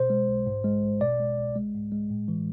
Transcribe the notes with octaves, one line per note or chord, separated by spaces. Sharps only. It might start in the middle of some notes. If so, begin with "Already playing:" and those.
Already playing: B2 C5
G#3
B1
G#2
G#3
A1
B2 D5
G#3
C2
G#3
G#2
G#3
A2
E3